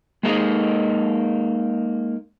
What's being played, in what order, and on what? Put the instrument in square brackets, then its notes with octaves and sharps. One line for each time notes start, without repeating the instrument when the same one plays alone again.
[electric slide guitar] G#3 A#3 D#4 G#4 D#5